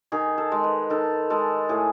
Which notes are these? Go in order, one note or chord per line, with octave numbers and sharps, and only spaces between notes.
D#3 G#4
A4
G#3
B4
D#3 A4
G#3 A4
A2 G#4